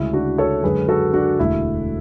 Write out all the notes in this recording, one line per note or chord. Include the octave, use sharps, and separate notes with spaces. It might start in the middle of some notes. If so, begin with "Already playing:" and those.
Already playing: D2 C#3 G#3 E4
D4 F#4
A4 C#5
F#2 D3 G#3 G#4 B4
F#4 A4
D4 F#4
E1 D2 D3 A3 E4